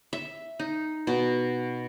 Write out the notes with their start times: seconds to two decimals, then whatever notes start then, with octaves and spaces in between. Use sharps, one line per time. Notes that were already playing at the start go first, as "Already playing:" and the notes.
0.13 E5
0.59 D#4
1.07 B2